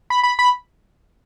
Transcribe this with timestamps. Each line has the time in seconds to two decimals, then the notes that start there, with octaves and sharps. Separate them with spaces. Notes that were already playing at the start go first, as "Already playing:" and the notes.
0.10 B5
0.23 B5
0.39 B5